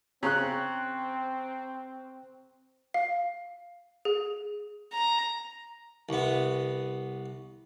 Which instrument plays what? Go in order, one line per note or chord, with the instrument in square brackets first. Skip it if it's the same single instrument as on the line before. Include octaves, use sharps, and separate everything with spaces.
[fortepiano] C#3 [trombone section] C4 [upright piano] A#5 C#6 F#6
[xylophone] F5
G#4
[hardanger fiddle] A#5
[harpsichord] C2 B3